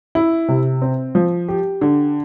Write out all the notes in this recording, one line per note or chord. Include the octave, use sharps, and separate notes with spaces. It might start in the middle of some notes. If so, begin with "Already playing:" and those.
E4
C3
C4
F3
G4
D3